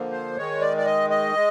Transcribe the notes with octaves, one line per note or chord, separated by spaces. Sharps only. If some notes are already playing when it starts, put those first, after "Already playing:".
Already playing: D3 F3 A#3
C5
D#3 G#3 C#5
D5
D5
D#5
D#5
G#3